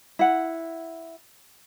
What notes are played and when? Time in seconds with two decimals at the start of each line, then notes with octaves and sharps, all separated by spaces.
0.19 E4 F#5